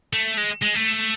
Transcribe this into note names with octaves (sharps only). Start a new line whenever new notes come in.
A3
G#3
G#3
A3